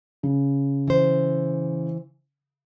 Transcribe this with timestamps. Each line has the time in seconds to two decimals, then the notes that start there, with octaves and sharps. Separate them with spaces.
0.23 C#3
0.88 E3 C5